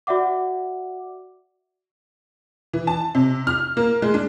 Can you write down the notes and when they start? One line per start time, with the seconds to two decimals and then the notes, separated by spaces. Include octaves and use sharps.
0.07 F#4 D5 E5 F#5 D6
2.73 E3
2.87 A5
3.15 C3
3.47 F6
3.77 A#3
4.02 G#3
4.14 D4